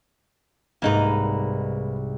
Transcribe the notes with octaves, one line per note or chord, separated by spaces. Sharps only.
C2 G#2 A#3 D#4 B4